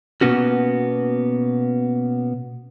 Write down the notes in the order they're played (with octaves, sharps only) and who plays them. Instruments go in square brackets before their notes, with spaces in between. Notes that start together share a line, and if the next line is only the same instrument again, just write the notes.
[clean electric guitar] B2 F#3 A#3 B3 C#4 F#4